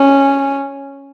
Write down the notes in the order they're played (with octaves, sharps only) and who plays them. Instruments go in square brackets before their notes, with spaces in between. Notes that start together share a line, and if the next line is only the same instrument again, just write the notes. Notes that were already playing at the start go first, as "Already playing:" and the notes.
Already playing: [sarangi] C#4